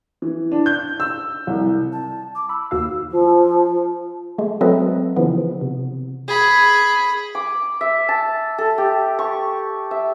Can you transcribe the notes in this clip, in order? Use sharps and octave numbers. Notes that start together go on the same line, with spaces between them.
E3
D4
G6
E6
C2
A5
D6
B5 E6
D#2 F#4 F5 E6
F3
G#3 A3
F#3 C4 A4 B4 D#5 E5
C#3 E3 F3 B3
C3
G#4 B5
D6
E5
A5
A4
G4
C#6
E5